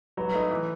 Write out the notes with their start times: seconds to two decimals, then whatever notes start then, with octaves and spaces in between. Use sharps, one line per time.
0.17 F#3 B4
0.34 A3 D#4
0.51 E3